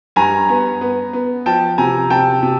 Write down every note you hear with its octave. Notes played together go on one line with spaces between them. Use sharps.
G2 G#5 A#5
B3
B3
B3
F3 G5 A5
C3 G#5 A#5
C3 G5 A5
C3